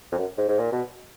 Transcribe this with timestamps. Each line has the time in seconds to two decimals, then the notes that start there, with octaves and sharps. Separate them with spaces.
0.12 F2
0.18 F#2
0.38 G#2
0.48 G#2
0.59 A#2
0.72 B2